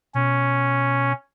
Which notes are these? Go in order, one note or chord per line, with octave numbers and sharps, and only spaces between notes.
B2 C#4